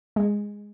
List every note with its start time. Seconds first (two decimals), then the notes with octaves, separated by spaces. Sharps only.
0.16 G#3